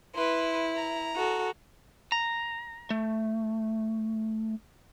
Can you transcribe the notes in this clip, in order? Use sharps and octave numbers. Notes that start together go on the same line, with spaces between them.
E4 B4 C6
A#5
F#4 A4
A#5
A3